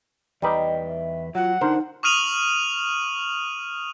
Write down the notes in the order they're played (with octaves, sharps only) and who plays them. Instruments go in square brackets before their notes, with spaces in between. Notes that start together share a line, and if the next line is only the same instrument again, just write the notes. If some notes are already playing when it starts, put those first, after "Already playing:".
[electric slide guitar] E2 B4 G5 [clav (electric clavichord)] G3 D#4 [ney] D#5
[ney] E5
[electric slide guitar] F#3 [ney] F4 [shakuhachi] F#5
[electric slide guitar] D3 D4 [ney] D#4 [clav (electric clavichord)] A#4 C5
[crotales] C#6 D#6 F6 D#7 F7 F#7